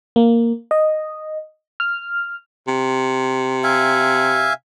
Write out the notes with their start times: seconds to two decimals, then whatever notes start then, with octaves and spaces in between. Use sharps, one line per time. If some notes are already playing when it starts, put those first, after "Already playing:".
0.16 A#3
0.71 D#5
1.80 F6
2.67 C3
3.64 E5 F5 G#5